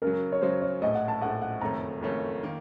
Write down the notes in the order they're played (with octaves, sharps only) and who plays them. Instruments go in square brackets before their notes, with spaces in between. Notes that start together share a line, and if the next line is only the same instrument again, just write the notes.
[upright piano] F#2 C#3 F#3 [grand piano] A#4
[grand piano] C#5
[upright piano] F#2 C#3 F#3 [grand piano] C5
[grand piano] C#5
[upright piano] A#1 A2 A3 [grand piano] D#5
[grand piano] F#5
A5
[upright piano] A#1 A2 A3 [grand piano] F#5
[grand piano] F#5
[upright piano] F#1 F2 D#3 A3 C#4 [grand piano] A#5
[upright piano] F#1 F2 D#3 A3 C#4
D#3 A#3